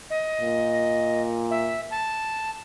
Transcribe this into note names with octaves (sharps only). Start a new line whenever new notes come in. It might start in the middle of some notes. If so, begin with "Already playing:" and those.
D#5
A#2
E5
A5